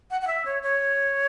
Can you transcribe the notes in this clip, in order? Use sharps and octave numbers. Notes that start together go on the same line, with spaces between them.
F#5
F#5
E5
C#5
C#5